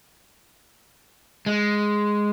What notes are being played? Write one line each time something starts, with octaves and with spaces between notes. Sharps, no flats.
G#3